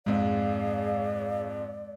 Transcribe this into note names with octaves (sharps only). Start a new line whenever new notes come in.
F2 G#2 G#3 G#4 D5 F5